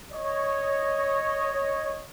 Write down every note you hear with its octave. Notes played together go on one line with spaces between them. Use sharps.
C#5 D#5